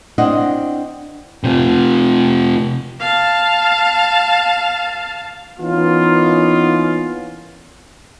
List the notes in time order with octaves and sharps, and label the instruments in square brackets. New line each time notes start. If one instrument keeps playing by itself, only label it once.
[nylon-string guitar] C4 D4 E4 D#5 F5 F#5
[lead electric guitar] C3 F4
[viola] F5 A5
[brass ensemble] E3 A#3 B3 C#4 D#4 F4